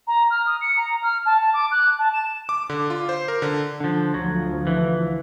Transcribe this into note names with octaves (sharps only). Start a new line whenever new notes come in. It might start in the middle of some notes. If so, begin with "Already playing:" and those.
A#5
F6
D#6
C#7
A#5
F6
A5
D6
F#6
A5
E7
D6
D3
F4
C5
A#4
D3
D3 F3
D2 F3 F#3
E3